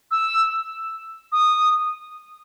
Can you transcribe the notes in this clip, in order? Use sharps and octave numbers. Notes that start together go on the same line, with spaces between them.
E6
D#6